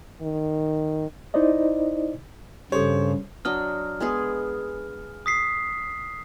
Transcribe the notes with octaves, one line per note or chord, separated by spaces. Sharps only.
D#3
D#4 E4 C5 D5 D#5
G2 C#3 G4 A4 C5 C#5
F#3 D4 D#5 F6
G#3 B3 G#4
D#6 B6 C7